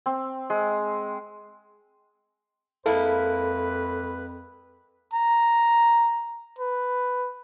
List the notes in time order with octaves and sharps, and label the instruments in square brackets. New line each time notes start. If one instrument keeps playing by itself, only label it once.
[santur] C4
G#3
[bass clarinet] F2 [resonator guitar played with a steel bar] G#3 A#3 E4 [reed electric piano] A4 [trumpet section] B4
[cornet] A#5
B4